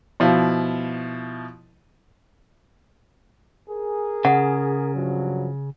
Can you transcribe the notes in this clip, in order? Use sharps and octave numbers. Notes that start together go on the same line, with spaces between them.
B2 F3 E4
G#4 A#4
C#3 F#5
G2 F3 F#3